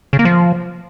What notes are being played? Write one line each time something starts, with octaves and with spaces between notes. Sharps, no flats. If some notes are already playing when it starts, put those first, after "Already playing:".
C#3
A#3
F3